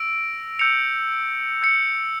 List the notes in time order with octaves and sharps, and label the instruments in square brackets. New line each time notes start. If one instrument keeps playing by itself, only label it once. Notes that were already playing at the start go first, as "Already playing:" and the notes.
Already playing: [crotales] E6 A#6 D7 F7
E6 G6 C#7 F7
E6 G6 C#7